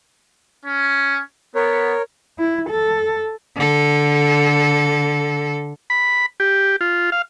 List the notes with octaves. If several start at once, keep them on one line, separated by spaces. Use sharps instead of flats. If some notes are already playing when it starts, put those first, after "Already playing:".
C#4
B3 A#4 C#5
E4
A4
D3 A4
B5
G4
F4
F5